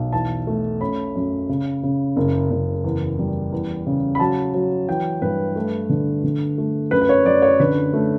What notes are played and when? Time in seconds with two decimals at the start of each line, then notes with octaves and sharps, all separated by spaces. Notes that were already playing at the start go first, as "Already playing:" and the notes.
Already playing: B1
0.13 E2 A5
0.47 A3
0.81 C#4 B5
1.15 F#2
1.49 C#3
1.83 C#3
2.16 F#1
2.51 F#1
2.84 E2
3.19 G3
3.52 E2
3.86 C#3
4.15 B5
4.20 F#3 A5
4.54 F#3
4.88 E3 G5
5.22 G2 B4
5.56 A3
5.89 D3
6.24 D3
6.58 A3
6.91 F#2 B4
7.01 B4
7.09 C#5
7.25 F#2 D5
7.42 C#5
7.60 D3 B4
7.93 A3